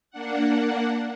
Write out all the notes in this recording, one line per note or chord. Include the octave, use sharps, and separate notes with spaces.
A#3 D4 F#5